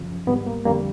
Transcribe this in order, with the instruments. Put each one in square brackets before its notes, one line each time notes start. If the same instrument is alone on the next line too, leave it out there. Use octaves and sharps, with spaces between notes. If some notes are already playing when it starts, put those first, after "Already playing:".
Already playing: [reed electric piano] F#2 C#3 F3
G#2 D#3 G3 B3
A#3
F2 D3 G3 A#3